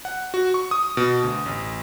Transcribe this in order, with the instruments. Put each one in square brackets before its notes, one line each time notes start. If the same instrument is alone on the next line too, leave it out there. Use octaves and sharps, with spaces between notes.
[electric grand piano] F#5
F#4
C#6
D#6
B2
D2
A1